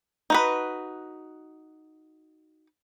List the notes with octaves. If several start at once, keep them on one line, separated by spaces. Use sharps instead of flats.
D#4 F#4 B4